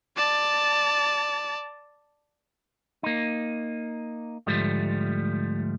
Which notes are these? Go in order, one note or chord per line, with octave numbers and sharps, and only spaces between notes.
D5 A5
A#3 D#4
D2 G#2 F3 G3 A3